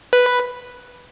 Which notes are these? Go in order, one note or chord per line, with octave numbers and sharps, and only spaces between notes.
B4